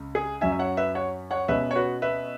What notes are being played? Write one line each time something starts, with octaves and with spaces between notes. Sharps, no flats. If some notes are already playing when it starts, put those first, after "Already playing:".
Already playing: C#2 C#3
G#4
F#2 F#3 C#4 E5 G#5
E5
C#5 F#5
B4 E5
C#5 F#5
C#5 F#5
B2 G#3 C#4 B4 E5
C#5
F#4 B4
B4 E5